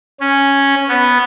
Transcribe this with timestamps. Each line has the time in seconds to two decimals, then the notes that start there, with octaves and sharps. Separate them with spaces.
0.20 C#4
0.89 B3